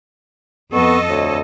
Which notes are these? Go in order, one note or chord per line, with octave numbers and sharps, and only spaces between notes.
F2 B3 A4 D#5 C#6
D2 C#5